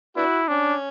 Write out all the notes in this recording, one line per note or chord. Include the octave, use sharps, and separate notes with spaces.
B3 D4 E4 F#4
C#4 D4